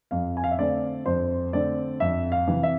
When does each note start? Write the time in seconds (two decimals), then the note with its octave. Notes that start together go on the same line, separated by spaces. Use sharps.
0.11 F2 F5
0.37 G#5
0.44 F5
0.51 E5
0.59 D3 A3 C4 D5
1.06 F2 C5
1.53 D3 A3 C4 D5
2.00 F2 E5
2.32 F5
2.48 C3 E3
2.63 E5